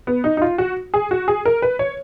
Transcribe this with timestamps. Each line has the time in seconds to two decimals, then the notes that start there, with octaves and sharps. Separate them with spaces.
0.07 B3
0.24 D#4
0.37 D#4
0.42 F4
0.58 F#4
0.94 G#4
1.11 F#4
1.28 G#4
1.45 A#4
1.62 B4
1.79 C#5